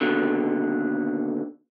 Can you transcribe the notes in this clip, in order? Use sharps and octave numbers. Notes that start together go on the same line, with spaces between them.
D#2 B2 D3